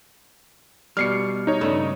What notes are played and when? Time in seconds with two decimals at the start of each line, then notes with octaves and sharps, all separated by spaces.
0.97 B2 G3 F6 C7 C#7
1.47 D#4 C#5
1.61 G2 C#3 A3